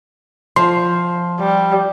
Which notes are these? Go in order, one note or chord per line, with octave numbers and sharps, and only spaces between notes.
F3 C6
G3